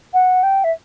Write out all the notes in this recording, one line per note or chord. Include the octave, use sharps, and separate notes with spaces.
F#5
G5
E5